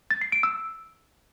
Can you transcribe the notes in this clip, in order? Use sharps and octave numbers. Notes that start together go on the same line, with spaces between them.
A6
C7
D7
E6